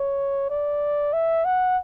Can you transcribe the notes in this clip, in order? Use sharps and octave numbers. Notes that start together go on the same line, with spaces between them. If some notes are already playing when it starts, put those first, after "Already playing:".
Already playing: C#5
D5
E5
F#5